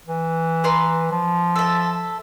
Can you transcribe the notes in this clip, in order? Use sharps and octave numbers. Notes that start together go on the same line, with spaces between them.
E3
B4 A#5 C6
F3
A4 E5